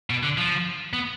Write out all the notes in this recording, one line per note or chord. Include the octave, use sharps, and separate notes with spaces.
B2
D3
F3
B3